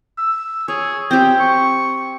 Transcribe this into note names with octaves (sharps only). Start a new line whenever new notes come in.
E6
G#4 C#5
C4 G4 G5
C#6